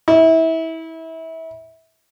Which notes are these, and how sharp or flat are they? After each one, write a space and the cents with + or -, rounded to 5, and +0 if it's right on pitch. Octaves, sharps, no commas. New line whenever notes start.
E4 -25